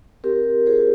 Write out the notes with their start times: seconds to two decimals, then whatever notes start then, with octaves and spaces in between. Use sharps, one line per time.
0.24 C4 G4 A#4
0.66 F4 G#4 C5